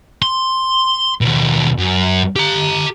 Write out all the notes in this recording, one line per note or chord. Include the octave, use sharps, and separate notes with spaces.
C6
D#2 B2
F#2
G4 A#5